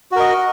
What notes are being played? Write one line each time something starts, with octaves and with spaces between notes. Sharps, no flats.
F#4 A#4 D#5